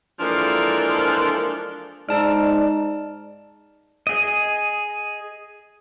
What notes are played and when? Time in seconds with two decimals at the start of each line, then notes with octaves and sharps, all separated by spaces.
0.19 E3 F3 G#3 A#3 D4 A4
2.09 G#2 D#4 D5 A5 F6
4.07 G#4 D#5